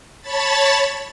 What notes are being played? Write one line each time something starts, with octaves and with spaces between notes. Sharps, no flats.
C#5 A5 B5 A6